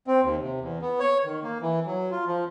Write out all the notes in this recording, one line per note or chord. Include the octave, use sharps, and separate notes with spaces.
C4
D#2
C3
E2
B3
C#5
D#3
A#3
E3
F#3
F4
F3